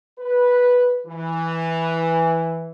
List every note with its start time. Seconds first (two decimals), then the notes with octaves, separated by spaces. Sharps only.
0.19 B4
1.06 E3